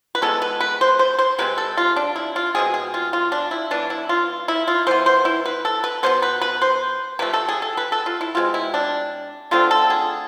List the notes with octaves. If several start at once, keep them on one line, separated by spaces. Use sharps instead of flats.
B4
E3 G#3 B3 A4
B4
B4
C5
C5
C5
C3 G#3 C4 B4
A4
F4
D4
E4
F4
B2 G#3 C4 G#4
G#4
F4
F4
D4
E4
E3 B3 D4
E4
F4
E4
F4
E3 B3 C5
C5
E4
B4
A4
B4
B2 G#3 B3 C5
B4
B4
C5
C3 F3 A3 C4 B4
A4
G#4
A4
B4
A4
F4
E4
B2 G#3 C4 F4
E4
D4
D3 A3 C4 F4
A4
G#4